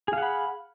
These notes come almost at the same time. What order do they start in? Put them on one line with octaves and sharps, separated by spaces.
G#4 F5 F#5 B5